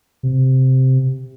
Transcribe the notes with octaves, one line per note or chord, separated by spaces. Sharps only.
C3